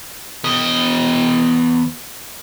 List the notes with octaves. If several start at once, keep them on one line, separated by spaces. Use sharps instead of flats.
E2 D#5